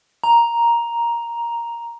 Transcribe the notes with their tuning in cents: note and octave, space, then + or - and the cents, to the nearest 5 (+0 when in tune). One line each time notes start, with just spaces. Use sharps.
A#5 +5